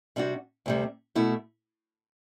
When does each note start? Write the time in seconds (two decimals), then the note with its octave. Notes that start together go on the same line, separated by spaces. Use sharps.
0.16 C3 G3 D4 F#4
0.66 D2 C3 G3
1.15 B2 A3 E4